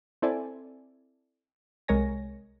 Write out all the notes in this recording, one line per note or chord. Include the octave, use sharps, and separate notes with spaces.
C4 E4 A4 D5 G#5
C2 G#3 A#4 C#5 G#5 A#6